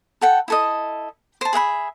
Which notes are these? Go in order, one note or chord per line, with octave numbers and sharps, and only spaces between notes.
A4 F#5 G5
E4 A4 D#5
C5 A5
G#4 E5 F#5 B5